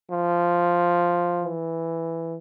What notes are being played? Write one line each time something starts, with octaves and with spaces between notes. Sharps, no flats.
F3
E3